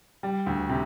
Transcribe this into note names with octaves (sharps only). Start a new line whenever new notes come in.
G3
D2
C3